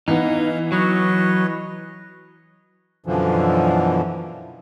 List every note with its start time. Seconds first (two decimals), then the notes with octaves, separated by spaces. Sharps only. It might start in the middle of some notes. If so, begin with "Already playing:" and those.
0.08 E3 B3 D#4 F5
0.72 F#3 B4 C#5 D#5
3.06 F#2 B2 D3 E3 F3